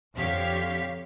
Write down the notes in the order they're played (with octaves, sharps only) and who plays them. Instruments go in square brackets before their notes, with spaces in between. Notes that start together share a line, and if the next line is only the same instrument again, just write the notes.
[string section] F2 D3 G4 C#5 F5 B6